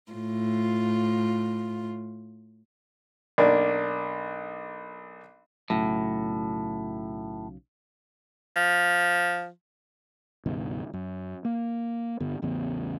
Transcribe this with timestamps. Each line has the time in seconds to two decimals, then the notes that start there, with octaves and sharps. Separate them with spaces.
0.11 A2 F4
3.38 B1 A#3 D4
5.70 B1 A2 C#3 F#3
8.56 F3
10.46 C#2 G2 B2 D#3
10.93 F#2
11.45 A#3
12.20 G2 D3 B3
12.42 A1 E2 C#3 B3